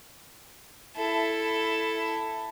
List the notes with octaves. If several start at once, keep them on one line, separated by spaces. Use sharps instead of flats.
E4 A4